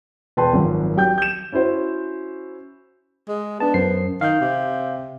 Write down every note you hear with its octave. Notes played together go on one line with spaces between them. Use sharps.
E1 B4 G5 A5 C6
G#1 F#2 F3
F#3 G4 G5 G6
G6 E7
C#4 E4 F#4 C5
G#3
B3 D4 A5
F#2 C5 C7
D#3 F5 G6
C3